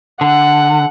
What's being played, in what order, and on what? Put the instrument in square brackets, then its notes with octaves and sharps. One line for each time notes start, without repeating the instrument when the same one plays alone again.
[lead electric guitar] D3 [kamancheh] F#5